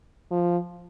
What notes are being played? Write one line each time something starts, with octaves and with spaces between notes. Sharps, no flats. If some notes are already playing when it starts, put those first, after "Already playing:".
F3